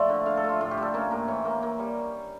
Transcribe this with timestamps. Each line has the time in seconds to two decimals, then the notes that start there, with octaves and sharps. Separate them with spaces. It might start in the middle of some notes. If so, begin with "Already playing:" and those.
Already playing: A2 F3 A3 D5
0.09 D3
0.26 D3 F5
0.37 A4
0.44 A3
0.49 F4
0.61 A2 F4
0.71 G4
0.77 G3
0.83 A4
0.94 A#3 C#4
1.11 A2 A#4
1.28 E3 C#5
1.45 A#3
1.63 A#3
1.79 G3